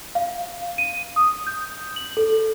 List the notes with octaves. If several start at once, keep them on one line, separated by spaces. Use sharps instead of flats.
F5
D#7
D#6
G6
F#7
A4